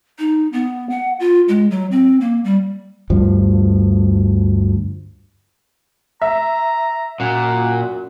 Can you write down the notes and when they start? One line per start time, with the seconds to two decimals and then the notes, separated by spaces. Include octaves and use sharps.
0.19 D#4
0.53 B3
0.90 F#5
1.20 F4
1.48 G#3
1.71 F#3
1.91 C4
2.21 A#3
2.44 G3
3.10 D2 G2 F3
6.22 E5 A#5
7.20 F#2 A#2 F#5